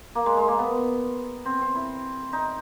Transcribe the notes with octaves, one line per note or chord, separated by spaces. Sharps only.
A#3
G#3
G#3
A#3
B3
C4
C4
E4
D#4